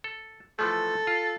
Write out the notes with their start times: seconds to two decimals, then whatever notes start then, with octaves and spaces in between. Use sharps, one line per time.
0.04 A4
0.59 E3 F3 A3 A4
1.07 F4